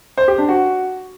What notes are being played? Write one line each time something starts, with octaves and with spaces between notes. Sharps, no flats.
C5
G4
D4
F#4